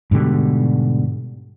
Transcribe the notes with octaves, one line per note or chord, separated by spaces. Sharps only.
G#2 B2 D3 G3